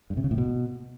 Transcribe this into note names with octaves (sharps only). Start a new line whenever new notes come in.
G2
C3
C#3
A2
B2